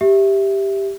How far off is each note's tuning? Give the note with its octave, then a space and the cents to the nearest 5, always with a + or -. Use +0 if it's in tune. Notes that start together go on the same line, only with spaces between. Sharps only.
G4 +0 E5 +0